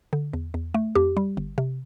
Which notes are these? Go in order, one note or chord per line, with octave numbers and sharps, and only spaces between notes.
D3
E2
E2
A3
F2 G4
G3
G1
C3